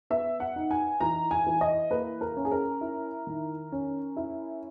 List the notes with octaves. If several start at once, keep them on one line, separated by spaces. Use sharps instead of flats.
B3 E5
F#5
D#4
G#5
E3 A#5
G#5
E3
D#5
A#3 B4
A#4
C#4
G#4
A#4
E4
D#3
C#4
E4